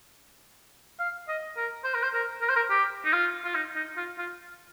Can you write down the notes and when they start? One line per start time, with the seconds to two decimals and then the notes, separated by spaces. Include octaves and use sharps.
1.00 F5
1.28 D#5
1.57 A#4
1.84 C5
1.95 A#4
2.03 C5
2.14 A#4
2.42 A#4
2.49 C5
2.56 A#4
2.70 G4
3.05 D#4
3.13 F4
3.45 F4
3.55 D#4
3.76 D#4
3.97 F4
4.18 F4